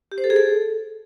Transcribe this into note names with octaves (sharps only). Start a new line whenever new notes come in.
G4
C5
A4
G#4
A4